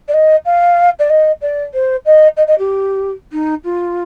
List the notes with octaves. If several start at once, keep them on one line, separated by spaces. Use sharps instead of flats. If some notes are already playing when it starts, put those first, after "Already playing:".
D5
D#5
F5
D5
D#5
D5
C5
D#5
D#5
D#5
G4
D#4
F4